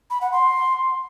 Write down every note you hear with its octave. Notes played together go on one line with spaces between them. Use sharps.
B5
F#5
C6